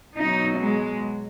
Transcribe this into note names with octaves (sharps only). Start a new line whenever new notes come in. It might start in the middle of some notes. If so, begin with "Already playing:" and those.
B2 F#3 D#4
G#3